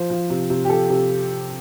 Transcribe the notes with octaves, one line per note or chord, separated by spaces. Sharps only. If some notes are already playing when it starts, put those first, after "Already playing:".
Already playing: F3 C5
F3
C3
C3
G4
F3 A4
C3